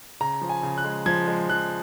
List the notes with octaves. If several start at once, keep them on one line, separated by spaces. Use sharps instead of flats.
C#3 A#5
F3
G#5
C#3
F#6
G#3
F3 G#6
G#3
F3 F#6